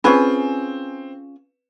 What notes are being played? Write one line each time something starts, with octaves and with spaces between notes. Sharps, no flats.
C4 C#4 F4 G#4 B4 B5